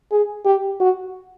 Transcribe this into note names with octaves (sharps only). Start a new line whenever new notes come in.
G#4
G4
F#4